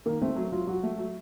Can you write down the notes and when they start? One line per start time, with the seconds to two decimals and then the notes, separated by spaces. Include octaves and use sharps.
0.06 D#3 A#3
0.21 A3 C4
0.36 F#3
0.52 F#3 F4
0.67 F#3 F#4
0.83 A3
0.98 F#3